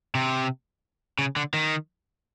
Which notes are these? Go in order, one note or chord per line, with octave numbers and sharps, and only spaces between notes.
C3
C#3
D3
D#3